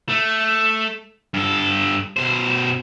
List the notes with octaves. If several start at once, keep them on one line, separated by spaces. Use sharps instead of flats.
A3
G2 A4
B2 C5